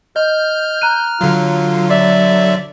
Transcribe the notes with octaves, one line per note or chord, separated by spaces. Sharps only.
D#5 F6 G6
A#5 F#6 D#7
D3 F#3 F4
D5 E5